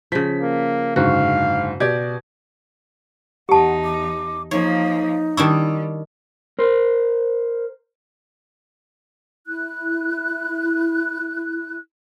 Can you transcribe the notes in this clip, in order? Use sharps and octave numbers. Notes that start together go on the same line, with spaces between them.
C#3 F3 B6
A#3
F#1 G#2 D3 F#4 F5
B2 G4 D5 G#6
E2 D#4 G4 F#5 A5
D6
F3 A#3 D#4 C#5
D#3 G3 D4 E4 C#6
A#4 C5
E4 F#6